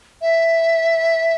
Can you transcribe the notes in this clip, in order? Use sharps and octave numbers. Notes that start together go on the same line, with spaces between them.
E5